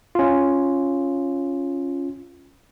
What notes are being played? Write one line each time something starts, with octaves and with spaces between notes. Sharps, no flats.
C#4 F4